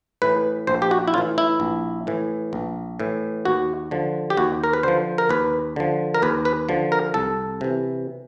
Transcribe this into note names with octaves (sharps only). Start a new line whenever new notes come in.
A2 E3 B4
A#1 C5
G4
F#4
E4
A2 E3 F4
E4
A#1
A2 E3
A#1
A2 E3
D#2 F#4
D3 F3
G4
D#2 F#4
A#4
B4
D3 F3 C5
A#4
D#2 B4
D3 F3
A#4
D#2 B4
B4
D3 F3
A#4
C2 A4
C3 E3